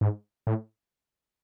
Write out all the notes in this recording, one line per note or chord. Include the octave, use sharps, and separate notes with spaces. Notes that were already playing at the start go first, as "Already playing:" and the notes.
G#2
A2